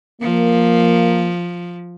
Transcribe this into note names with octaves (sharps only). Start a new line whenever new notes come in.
F3 A#3